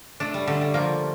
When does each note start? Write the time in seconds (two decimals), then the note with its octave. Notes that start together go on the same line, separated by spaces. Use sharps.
0.20 A3 D4
0.34 G3
0.47 D3 A3
0.61 G3
0.74 F3 A#3